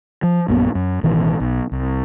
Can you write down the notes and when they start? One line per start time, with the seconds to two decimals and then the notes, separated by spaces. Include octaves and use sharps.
0.23 F3
0.48 A#1 F#2 A#2 B3
0.75 F#2
1.03 A1 B2 D#3 E3
1.40 B1
1.72 C2